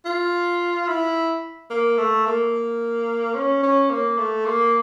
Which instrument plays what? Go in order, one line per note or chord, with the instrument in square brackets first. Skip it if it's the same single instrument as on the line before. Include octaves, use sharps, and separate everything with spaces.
[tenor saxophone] F4
E4
A#3
A3
A#3
C#4
C#4
A#3
A3
A#3